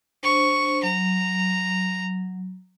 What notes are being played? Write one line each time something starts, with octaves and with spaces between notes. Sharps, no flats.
D4 C5 C#6
F#3 A#5